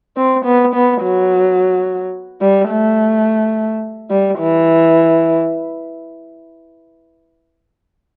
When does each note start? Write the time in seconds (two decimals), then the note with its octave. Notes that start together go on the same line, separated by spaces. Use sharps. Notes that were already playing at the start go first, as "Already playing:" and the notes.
0.17 C4
0.45 B3
0.74 B3
1.02 F#3
2.42 G3
2.70 A3
4.11 G3
4.39 E3